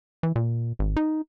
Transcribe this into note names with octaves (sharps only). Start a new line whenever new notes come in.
E3
A#2
G#1
D#4